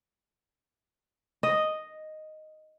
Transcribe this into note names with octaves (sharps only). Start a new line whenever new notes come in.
D#5